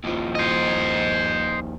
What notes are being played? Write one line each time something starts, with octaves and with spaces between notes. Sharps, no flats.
D#2 F3
C5 D#5